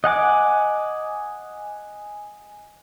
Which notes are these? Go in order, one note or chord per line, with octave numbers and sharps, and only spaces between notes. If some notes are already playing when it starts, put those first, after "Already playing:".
D#5 F#5 G#5 D6